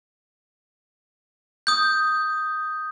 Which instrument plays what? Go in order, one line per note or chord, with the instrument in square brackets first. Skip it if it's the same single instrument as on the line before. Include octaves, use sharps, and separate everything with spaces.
[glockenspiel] D#6 G6